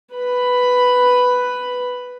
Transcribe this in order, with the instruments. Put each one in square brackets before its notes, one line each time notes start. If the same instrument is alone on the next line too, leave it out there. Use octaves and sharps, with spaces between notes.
[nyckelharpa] B4 B5